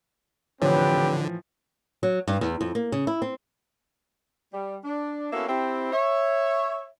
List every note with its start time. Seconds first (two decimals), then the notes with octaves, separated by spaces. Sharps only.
0.62 A2 D3 E3 F3 C4 G4 B4 C#5
2.03 F#3
2.27 G2
2.41 E2
2.61 F2
2.75 A#3
2.92 C#3
3.07 E4
3.22 C4
4.53 G3
4.84 D4
5.32 A#3 B3 C#4 E4 F#4 A4
5.48 C4 E4 G4
5.92 C#5 E5